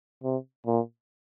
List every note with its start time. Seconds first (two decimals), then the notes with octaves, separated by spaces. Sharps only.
0.24 C3
0.67 A#2